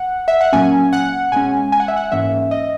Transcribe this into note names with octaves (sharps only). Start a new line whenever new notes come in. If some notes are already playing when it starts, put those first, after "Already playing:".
Already playing: F#5
E5
F#5
A#2 F#3 A#3 C#4 G#5
F#5
B2 G#3 C#4 G#5
G#5
F#5
E5
F#5
G#2 E3 A#3 C#4 E5
D#5